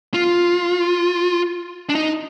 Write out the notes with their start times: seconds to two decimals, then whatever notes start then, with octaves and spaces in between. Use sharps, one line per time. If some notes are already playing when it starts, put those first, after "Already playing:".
0.14 F4
1.89 D4
1.95 D#4